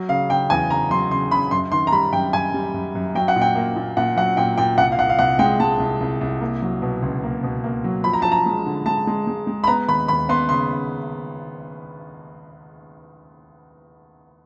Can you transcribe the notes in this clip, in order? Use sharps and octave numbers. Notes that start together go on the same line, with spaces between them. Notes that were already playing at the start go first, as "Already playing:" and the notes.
Already playing: F#3
C#3 F5
C#3 G5
E2 G#5
C#3 A#5
F#3 C6
C#3 C6
C#3 B5
F#2 C6
D#3 C6
A#5
G3 B5
F#2 G5
F#2 G#5
G3
F#2
F#2
F#3 G5
F#5
A#2
G5
A#3
A#2
A#2 F#5
F#3 F#5
A#2 G5
A#2 G5
C2 F#5
F5
C2 F#5
F5
C2 F#5
G#3 G5
G#3 A5
C2
C2
C2
A#3
F#3
B2
C#2
A#3
B2
A#3
F#3
F3 B5
A#5
F3 A5
A#5
G#3
D3
G#3 A5
G#3
G#3
G#3
B5
B3 A#5
D#2 B5
D#2 B5
B3 C6
C#3 C6